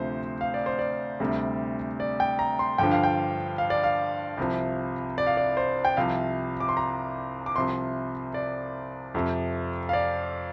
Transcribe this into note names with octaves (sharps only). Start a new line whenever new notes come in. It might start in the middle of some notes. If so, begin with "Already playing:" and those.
Already playing: D2 C3 F3 C5
F5
D5
C5
D5
D2 C3 G3
D5
G5
A#5
C6
G2 D3 F3 G5
F5
G5
F5
D5
F5
C2 C3 F3
D5
F5
D5
C5
G5
C2 C3 F3 F5
D6
C6
A#5
D6
C2 C3 F3 C6
D5
F2 C3 F3
F5
D5